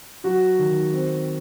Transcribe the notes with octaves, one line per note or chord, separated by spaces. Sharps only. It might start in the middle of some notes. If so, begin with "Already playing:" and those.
F#3 F#4
D#3
C4